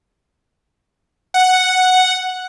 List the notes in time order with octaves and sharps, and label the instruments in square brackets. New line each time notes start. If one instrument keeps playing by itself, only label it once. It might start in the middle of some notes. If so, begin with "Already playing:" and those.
[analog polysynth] F#5